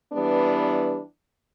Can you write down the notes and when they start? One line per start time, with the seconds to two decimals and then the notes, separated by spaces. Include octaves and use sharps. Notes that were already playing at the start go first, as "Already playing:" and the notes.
0.12 E3 G3 B3 D4